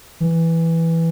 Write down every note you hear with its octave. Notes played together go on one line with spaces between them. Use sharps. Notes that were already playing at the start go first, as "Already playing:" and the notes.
E3